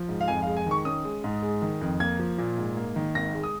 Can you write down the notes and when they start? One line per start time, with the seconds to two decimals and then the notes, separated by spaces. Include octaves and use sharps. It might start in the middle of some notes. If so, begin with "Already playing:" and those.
Already playing: F3
0.09 G#2
0.21 F5
0.28 F2 G#5
0.42 G#3 F5
0.57 G#5
0.66 D#3 C#6
0.85 C#4 D#6
1.05 G#3
1.24 G#2
1.42 G#3
1.62 D#3
1.81 F2
2.00 A#3 G#6
2.19 F3
2.38 A#2
2.58 G#2
2.77 A#3
2.96 D#3
3.15 G#1 A#6
3.34 G#3
3.43 D#6